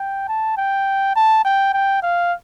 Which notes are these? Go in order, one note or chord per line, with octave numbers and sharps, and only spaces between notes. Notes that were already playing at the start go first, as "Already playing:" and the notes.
Already playing: G5
A5
G5
A5
G5
G5
F5